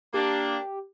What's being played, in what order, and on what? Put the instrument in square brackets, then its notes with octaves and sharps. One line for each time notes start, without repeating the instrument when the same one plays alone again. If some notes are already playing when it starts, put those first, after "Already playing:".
[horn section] A#3 D4 [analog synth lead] G4